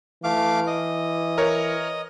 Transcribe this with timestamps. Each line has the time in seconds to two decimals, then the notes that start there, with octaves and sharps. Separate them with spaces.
0.24 E3 A3 F5 D6
0.67 D#5
1.38 A#4 C#5